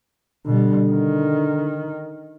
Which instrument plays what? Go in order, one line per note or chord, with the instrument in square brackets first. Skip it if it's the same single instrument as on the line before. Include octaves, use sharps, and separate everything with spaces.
[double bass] B2 G3 [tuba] D3
[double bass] D#3